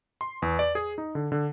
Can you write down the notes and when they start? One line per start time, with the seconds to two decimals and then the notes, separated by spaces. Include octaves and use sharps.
0.21 C6
0.42 E2
0.59 D5
0.75 G#4
0.98 D#4
1.15 D3
1.32 D3